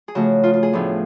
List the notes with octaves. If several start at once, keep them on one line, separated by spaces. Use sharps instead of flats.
G#4
C#3 F3 A3 F#4
F4
F4
G#4
A2 F3 B3 D4